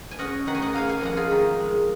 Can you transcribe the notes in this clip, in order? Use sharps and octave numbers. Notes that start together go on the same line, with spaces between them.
G#5
C#4 D#5 F#5
D#3 F#5
G#5
D#5 F#5
A#3 F5 G#5
F5 G#5
F2 D#5 F#5
F4 G#4
D#3
G#3